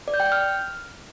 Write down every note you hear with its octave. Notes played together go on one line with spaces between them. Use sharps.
D5
G6
G5
G6
F6